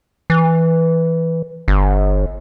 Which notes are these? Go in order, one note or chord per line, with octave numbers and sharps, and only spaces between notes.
E3
G1